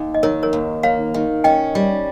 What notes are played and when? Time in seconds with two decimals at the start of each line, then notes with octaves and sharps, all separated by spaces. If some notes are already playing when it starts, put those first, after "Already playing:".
Already playing: D#2
0.14 D#5
0.23 D#3 A#4 C#5
0.43 A#4 C#5
0.53 D#2
0.83 A#3 C#5 F5
1.14 D#3
1.44 C#4 D#5 G5
1.75 G3